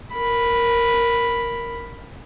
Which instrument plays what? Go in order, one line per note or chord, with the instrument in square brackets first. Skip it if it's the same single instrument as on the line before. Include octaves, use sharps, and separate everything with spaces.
[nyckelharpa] A#4 B5